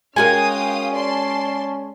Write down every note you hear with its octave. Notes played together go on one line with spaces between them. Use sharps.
G#3 C#4 F#4 A#4 F5 G5 G#5 D#6
D5 A5 C6